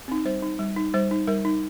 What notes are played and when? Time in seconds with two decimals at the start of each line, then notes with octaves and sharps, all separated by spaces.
0.08 C4 D#4
0.25 G3 C5
0.42 D#4
0.59 G3
0.76 D#4
0.94 G3 C5
1.11 D#4
1.28 G3 A#4
1.45 D#4